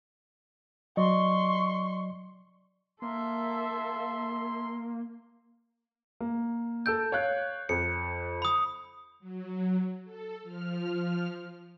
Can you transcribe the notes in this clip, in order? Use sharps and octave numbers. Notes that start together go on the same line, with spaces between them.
F#3 D5 D#5 C6 C#6
A#3 A4 E5 C6
A#3
A4 E6 G6 D7
C#5 F5 F#6
F2 C#7
B5 D#6
F#3
A4
F3 F6